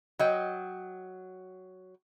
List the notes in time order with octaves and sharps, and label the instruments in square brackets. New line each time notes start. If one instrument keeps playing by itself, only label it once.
[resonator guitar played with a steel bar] F#3 D#5 G5